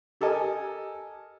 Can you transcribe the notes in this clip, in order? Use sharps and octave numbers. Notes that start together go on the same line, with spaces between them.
G4 A4 A#4 D#5 G#5